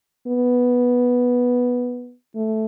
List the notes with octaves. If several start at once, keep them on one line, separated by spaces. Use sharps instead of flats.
B3
A3